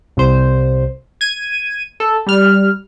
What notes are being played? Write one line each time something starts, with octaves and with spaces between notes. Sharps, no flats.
C2 C5
G#6 D#7
A4
G3 F6